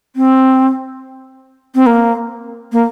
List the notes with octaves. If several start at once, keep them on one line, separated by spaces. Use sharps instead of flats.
C4
C4
A#3
A#3